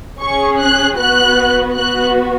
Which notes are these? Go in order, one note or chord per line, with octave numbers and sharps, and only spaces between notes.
C#4 G#4 C#6
F#6
B3 F#4 F#6
B3 F#4 F#6